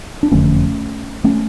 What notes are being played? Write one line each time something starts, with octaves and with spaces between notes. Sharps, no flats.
D4
F#1 F2 D3 A3 C#4
A3 C#4